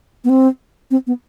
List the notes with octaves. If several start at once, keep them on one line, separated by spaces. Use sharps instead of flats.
B3
C4
C4
B3